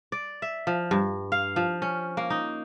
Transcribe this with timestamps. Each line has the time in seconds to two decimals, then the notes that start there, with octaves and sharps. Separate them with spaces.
0.12 D5
0.42 E5
0.67 F3
0.91 G2
1.32 F5
1.56 F3
1.82 C#4
2.17 A#3
2.30 D#4